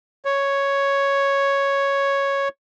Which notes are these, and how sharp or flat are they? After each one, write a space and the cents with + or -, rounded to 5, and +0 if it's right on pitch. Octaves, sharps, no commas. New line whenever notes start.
C#5 +0